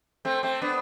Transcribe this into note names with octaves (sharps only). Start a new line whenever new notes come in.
A3 C4
A3 C4
B3 D4